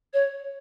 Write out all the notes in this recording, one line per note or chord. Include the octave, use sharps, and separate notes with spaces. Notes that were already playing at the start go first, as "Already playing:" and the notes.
C#5